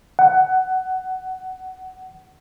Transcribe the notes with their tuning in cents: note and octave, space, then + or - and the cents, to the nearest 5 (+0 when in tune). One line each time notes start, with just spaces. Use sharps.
F#5 +15